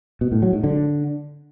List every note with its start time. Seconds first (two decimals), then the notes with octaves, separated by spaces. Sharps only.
0.21 B2
0.32 A2
0.42 F#3
0.53 G#2
0.64 D3